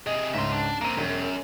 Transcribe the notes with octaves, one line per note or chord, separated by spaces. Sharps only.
C3 G#4 D#5
C#2 G#2 C#4 E5 C6
D4
A#3 C4 A#5 D#7
E1 F#2